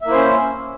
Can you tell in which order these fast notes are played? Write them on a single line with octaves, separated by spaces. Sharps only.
E5 A#3 E4 C5 C#4